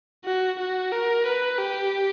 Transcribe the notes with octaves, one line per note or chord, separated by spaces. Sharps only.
F#4
F#4
A#4
B4
G4